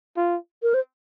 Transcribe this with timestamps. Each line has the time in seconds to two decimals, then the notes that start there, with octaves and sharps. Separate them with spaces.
0.17 F4
0.63 A#4
0.74 C5